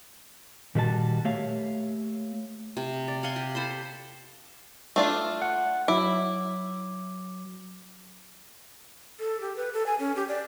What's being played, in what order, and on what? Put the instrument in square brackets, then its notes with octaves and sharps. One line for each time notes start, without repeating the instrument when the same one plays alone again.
[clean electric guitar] A#2 D#3 G3 F#4 C5 A5
A3 A#3 G4 C#5 E5 F5
[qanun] C3
D5
F5 F#5 G#5 C6
G4
A4 C5 B5 C6
[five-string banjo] A3 D4 F4
[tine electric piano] F#5
[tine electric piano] F#3 D6 [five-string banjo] E4
[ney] A4
G4
B4
A4
G#5
C#4
G4
D5